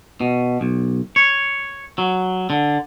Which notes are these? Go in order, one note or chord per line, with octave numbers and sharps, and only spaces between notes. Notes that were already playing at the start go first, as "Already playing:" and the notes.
B2
B1
C#5
F#3
D3